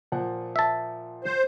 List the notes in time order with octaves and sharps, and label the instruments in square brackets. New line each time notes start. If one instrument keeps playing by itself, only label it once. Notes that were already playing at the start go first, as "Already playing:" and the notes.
[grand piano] A#2 F3 F#5
[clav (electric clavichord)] E5 A5
[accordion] C5